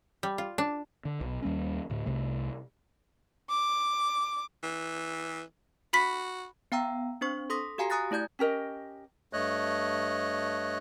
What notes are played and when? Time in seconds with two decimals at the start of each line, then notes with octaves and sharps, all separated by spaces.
0.23 G3
0.38 F4
0.58 D4
1.05 D3
1.21 B1 B2
1.42 D#2 G3 A#3 C#4
1.90 D2 A2
2.06 C2 C3 A3
3.50 D6
4.63 E3
5.93 F#4 B5 B6
6.72 B3 F5 G5 A#5 E6
7.21 C4 D4 C5 C#6
7.50 A4 C6 D#6 A#6 B6
7.78 F#4 G4 F5 G#5 A#5 C7
7.90 G#5 A#5 D#6 F#6 A6 A#6
8.11 A3 E4 D5 G6 G#6
8.39 C#4 G4 A#4 D#5
9.33 G2 A3 C#5 D#5 F#6